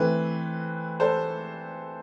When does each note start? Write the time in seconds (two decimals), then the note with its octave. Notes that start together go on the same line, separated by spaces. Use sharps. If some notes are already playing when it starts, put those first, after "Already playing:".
Already playing: E3 A3 C4 B4
1.00 A4 C5